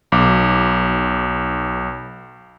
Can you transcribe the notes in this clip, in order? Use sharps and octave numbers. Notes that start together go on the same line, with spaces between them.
B1 D6